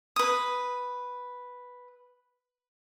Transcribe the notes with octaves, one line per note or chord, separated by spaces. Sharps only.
B4 D#6